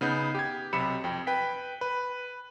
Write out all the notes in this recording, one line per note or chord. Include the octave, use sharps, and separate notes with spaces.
C#3 B3 D#4 G6
G4 G#6
B1 C3 B5 C#7 E7
F2 G5
B4 G5 B6
B4